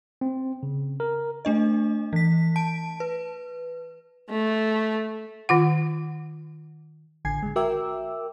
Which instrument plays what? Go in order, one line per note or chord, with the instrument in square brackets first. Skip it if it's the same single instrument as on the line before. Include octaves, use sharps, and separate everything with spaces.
[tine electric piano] C4
C#3
A#4
[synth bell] A3 D4 D#5
E3 B6
A5 D7
B4
[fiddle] A3
[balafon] D#3 F4 F#5
[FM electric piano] A1 D3 G#5 G#6 C7
D3 G#3
F#4 A#4 E5 G5 D6 E6